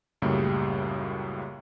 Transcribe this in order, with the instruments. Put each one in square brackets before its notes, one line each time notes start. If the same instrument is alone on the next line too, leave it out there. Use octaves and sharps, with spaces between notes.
[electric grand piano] C#2 F#2 A2 C#3 G3 A#3